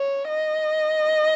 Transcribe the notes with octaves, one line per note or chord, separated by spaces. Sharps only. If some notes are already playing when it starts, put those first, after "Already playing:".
Already playing: C#5
D#5